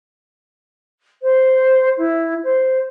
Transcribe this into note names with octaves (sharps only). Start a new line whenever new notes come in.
C5
E4
C5